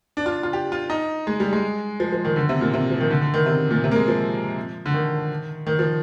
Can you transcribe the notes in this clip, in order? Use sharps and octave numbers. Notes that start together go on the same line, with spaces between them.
D4
F4
F4
G4
F4
D#4
G#3
G3
G#3
F3
F3
D#3
D3
C3
A#2
C3
F3
D#3
D3
D3
D#3
C3
A#2
C3
A#3
G#3
F3
D3
D#3
D#3
F3